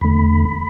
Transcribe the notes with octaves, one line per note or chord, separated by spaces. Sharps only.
E2 D3 A3 B5